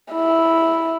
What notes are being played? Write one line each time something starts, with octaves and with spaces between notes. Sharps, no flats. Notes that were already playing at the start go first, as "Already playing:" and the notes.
E4